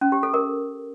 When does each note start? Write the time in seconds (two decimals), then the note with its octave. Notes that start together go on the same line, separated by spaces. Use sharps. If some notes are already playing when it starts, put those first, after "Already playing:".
0.01 C#4
0.12 G4
0.23 A4
0.34 A#4